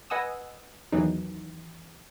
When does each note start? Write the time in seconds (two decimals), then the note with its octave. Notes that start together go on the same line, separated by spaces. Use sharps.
0.10 B4 D#5 F#5 G#5 D#6 E6
0.92 E2 D#3 E3 F#3 D#4